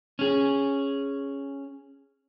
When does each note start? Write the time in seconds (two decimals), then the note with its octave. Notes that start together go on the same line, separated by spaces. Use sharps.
0.19 C#4 G#4